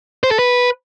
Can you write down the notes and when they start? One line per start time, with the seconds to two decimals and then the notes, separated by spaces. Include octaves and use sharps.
0.23 C5
0.31 A4
0.39 B4